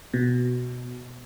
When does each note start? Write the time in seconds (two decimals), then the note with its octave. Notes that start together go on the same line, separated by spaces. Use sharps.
0.14 B2